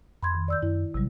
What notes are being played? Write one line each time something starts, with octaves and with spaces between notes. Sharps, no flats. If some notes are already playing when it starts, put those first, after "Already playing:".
F2 B5 C6 G#6
D#3
D5 E6 G6
F#2 E4
A1 C3 F#3 G3